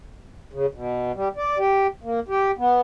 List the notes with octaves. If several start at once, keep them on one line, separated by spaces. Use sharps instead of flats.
C#3
B2
G3
D5
G4
A#3
G4
B3